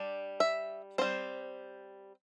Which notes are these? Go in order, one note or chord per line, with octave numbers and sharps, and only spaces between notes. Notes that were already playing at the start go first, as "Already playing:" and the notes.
Already playing: G3 D4
E5
G3 C4 C5